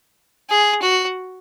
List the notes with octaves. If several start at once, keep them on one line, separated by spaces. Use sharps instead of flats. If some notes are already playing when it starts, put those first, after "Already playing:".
G#4
F#4